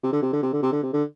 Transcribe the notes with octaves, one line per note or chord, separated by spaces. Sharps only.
C3
D3
C3
D3
C3
D3
C3
D3
C3
D3